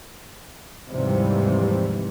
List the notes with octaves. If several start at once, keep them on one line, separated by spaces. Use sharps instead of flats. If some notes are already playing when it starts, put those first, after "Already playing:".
D#2 G#2 C3 E3 F3 G3